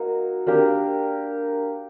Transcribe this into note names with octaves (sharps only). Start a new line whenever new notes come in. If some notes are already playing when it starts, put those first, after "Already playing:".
Already playing: A#3 D#4 F#4
A#3 D4 G4 A#4